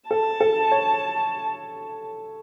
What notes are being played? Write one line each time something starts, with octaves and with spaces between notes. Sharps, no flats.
A4 A5
A4
C#5